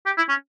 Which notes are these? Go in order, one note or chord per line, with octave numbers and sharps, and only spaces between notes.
G4
E4
C#4